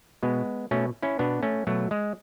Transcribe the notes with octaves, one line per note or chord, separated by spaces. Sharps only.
B2 G#3 B3
B2 A3 C#4
C#4 E4
B2 B3 D4
A3 C#4
B2 F#3 A3
G#3